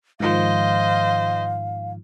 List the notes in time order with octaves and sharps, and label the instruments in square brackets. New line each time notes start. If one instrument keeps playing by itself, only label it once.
[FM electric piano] G#2 D#3 F3 [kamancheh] C5 D#5 [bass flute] F5